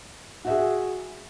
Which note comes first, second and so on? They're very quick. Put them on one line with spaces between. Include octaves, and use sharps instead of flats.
F#4 E5 G#4